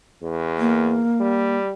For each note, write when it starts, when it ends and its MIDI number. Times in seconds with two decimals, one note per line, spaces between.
0.23 1.03 40
0.59 1.57 58
1.20 1.73 55